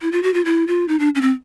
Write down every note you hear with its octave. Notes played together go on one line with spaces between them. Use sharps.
E4
F4
F#4
F4
E4
F4
D#4
D4
C#4
C4